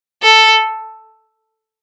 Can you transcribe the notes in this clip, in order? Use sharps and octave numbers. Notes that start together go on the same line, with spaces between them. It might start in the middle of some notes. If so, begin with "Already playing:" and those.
A4